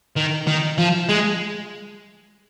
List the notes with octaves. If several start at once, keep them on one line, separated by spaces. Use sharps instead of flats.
D#3
D#3
F3
G#3